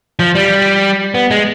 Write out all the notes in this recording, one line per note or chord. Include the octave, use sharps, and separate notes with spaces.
F3
G3
B3
G#3